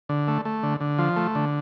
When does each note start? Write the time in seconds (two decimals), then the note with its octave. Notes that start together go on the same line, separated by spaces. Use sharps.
0.09 D3
0.28 A3
0.45 A3
0.63 D3
0.80 D3
0.98 F3
1.16 A3
1.35 D3